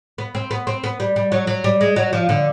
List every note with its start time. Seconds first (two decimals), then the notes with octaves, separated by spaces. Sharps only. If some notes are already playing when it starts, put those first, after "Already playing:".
0.18 B3
0.35 C4
0.51 B3
0.67 C4
0.84 B3
1.00 G3
1.16 G3
1.32 F#3
1.47 F#3
1.64 G3
1.81 G#3
1.96 F#3
2.13 F3
2.29 D3